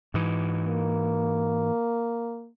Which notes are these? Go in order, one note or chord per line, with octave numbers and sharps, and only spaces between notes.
G#2 E3
A#3